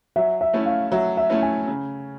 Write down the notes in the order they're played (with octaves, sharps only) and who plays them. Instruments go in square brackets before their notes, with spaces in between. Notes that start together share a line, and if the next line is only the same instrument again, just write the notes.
[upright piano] F#3 [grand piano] E5
[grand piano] E5
[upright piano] A3 C#4 E4
[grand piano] F5
[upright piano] F#3 [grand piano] E5
[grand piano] E5
[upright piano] A3 C#4 E4
[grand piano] G#5
[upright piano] C#3